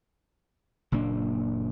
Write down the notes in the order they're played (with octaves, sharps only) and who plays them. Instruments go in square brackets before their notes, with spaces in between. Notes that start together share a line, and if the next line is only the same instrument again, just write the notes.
[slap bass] F#1 A#2 A#3 D4